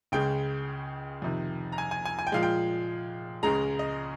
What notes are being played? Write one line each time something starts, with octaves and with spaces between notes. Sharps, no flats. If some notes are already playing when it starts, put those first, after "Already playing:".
C#2 C#3 G#3 G5
F2 C3 D#3
A#5
G#5
G#5
G#5
G#5
G5
A#2 F3 G#3 F5
G5
C#2 C#3 G#3 A#5
D#5